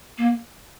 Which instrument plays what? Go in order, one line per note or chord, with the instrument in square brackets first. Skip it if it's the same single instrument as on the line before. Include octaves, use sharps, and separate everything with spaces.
[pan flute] A#3